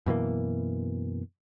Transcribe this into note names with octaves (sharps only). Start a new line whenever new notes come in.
F#2 B2 E3 A#3